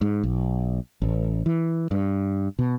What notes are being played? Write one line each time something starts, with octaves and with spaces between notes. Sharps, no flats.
G#2
B1
A1
E3
G2
B2